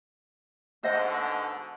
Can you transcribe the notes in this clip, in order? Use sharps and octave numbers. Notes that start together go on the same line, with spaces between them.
G#2 B2 D3 C5 D#5 F#5